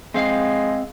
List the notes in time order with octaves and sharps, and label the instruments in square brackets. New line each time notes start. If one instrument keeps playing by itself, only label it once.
[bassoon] G#3 [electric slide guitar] C4 F5